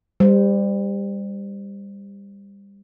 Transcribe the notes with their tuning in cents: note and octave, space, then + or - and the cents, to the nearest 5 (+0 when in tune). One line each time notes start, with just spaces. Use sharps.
G3 +25 C5 -15